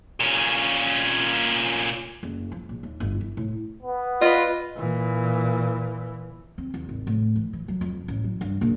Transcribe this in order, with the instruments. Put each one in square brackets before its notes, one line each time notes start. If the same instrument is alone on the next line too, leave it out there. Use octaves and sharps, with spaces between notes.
[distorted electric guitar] A#2 C#4
[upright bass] F#1
F3
A#1
D#2
G1
E4
A2
[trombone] B3
[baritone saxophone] F4 [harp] B4 D#5
[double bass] A#2 E3
[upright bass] C4
E2
G#1
A2
E3
E3
F#3
F2
A1
F#3
G2
A#1